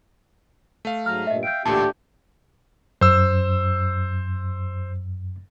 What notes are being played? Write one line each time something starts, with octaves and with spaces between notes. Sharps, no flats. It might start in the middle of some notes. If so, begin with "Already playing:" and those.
A3 F5
G#2 F#3 A#5 F6
G2 A#2 D#5 E5
E5 F5 G5 G6 D7
A1 D2 A#2 A3 D4 G4 A5
F#2 C5 E6